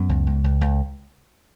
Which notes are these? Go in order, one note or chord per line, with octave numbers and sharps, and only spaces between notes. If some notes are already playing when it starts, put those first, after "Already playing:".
Already playing: F#2 B3
C#2
C#2
C#2
C#2